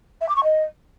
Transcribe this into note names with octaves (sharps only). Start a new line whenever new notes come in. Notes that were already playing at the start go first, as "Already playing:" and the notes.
E5
D6
C#6
D#5